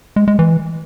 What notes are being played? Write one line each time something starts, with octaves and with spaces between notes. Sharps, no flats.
G#3
G#3
E3